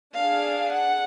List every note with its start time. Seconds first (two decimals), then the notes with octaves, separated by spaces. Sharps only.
0.16 D4 G#4 F5
0.73 F#5